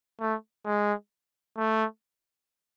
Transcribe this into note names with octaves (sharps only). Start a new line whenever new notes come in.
A3
G#3
A3